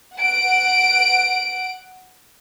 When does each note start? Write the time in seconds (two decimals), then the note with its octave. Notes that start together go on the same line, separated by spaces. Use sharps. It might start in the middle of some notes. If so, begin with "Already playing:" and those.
0.16 F#5 D7